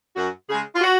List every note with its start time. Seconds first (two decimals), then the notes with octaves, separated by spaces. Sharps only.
0.16 F#2 F#4
0.49 C#3 G#3 G#4
0.74 F4
0.81 F#4